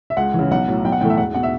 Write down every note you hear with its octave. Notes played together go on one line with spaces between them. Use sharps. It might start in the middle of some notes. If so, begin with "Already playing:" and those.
E5
C#2 F#5
C#3 E3
B1 F#5
A2 F#3
B1 G5
F#5
A2 E3 A3 G5
E5
E1 F#5
B2 F#5
E5